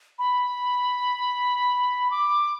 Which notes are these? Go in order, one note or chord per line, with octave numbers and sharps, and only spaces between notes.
B5
D6